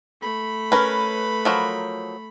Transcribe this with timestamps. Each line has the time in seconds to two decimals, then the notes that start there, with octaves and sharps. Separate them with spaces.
0.21 A3 B5
0.72 C#4 A#4 B4
1.45 F3 F#3 A#4